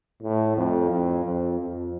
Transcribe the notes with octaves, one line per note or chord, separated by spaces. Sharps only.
A2
F2
F2
F2
F2